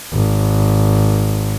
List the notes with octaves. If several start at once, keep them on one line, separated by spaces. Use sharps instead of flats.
G#1